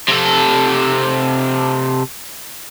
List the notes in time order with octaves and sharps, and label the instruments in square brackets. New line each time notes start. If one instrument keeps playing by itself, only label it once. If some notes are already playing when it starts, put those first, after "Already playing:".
[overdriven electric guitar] C3 A4